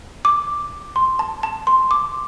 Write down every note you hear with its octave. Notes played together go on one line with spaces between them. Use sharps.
D6
C6
A5
A5
C6
D6